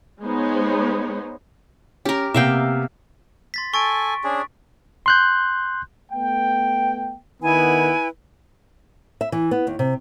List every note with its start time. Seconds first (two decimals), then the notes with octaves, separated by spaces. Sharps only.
0.22 G#3 B3 D#4 C5 C#5
2.05 C#4 G4 A#4
2.34 C3 A#3 B3 E5 F5 G5
3.54 C6 A6 B6
3.74 A4 G#5 C#6 A6 D7
4.24 C#4 D4 G#4
5.06 C6 F#6 G6
6.12 A3 B3 G5
7.43 D#3 B3 E4 B4 G#5
9.21 E5
9.32 E3
9.51 B3
9.67 D#2
9.79 C3